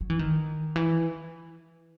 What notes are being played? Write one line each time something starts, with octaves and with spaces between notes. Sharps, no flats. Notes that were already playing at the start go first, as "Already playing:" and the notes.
F#3
E3
D#3
E3